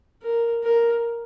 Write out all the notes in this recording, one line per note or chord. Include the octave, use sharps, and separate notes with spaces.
A#4
A#4